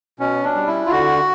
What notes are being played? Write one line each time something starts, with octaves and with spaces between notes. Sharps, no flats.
B2 C#4
D4
G3
E4
F4
D3 F#4